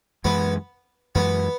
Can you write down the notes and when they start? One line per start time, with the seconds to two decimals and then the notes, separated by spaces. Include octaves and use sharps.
0.25 F#2 E3 G#3 B3
1.15 F#2 E3 G#3 B3